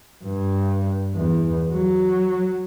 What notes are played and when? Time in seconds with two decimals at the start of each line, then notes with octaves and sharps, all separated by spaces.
0.25 G2
1.15 E2
1.72 F#3